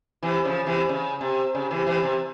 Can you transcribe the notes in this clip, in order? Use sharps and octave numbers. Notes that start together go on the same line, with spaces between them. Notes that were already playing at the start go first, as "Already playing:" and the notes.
C3 E3
C#3 F3
C3 E3
C#3
C3
C#3
C3 E3
C3 E3
C3